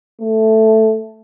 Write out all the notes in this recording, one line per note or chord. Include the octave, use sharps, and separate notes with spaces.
A3